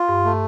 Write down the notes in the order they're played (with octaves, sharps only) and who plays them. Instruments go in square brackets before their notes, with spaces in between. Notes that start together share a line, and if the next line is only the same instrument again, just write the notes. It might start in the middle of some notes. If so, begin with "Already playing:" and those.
Already playing: [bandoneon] F4
[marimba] G2
[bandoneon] A3